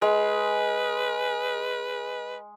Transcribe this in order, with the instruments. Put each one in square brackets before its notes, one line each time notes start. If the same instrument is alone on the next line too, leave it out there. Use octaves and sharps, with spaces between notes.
[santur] G#3 [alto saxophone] B4